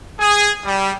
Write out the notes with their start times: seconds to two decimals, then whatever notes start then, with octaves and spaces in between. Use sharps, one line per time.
0.20 G#4
0.65 G3